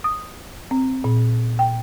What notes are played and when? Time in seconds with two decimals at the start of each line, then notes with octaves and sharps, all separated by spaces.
0.04 D#6
0.71 C4
1.04 A#2
1.59 G5